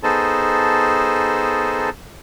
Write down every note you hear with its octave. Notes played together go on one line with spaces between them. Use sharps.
B3 D#4 G#4 A4 C5 A5